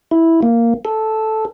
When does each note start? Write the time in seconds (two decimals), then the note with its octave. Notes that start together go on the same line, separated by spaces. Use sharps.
0.11 E4
0.42 A#3
0.85 A4